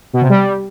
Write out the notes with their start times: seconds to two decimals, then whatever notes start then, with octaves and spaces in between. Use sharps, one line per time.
0.13 B2
0.21 C3
0.30 G3